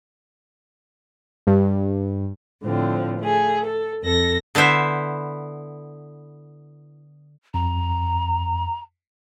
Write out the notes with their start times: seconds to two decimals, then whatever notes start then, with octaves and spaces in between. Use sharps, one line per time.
1.47 G2
2.65 A2 D3 F3 C4
3.19 A3 G#4
3.64 A4
4.03 F2 A4 A#6
4.55 D3 B3 E4 C5 E5
7.54 F2 A#5